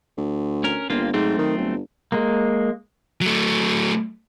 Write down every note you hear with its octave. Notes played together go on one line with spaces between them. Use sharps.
D2
C#4 A#4
G1 A#3 C4 F4
G#2 F#3 A3 C4
D#3
G1
G#3 A#3
F#3 A3